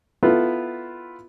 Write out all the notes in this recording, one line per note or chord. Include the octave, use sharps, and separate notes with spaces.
B3 E4 F4 A4 B4